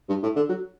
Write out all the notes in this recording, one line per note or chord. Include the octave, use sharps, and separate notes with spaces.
G2
A2
D3
F#3